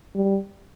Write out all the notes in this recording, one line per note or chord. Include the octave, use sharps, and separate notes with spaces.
G3